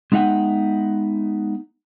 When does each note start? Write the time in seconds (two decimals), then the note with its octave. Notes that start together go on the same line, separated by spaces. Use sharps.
0.12 G#3 B3 D#4 E5 F#5 G5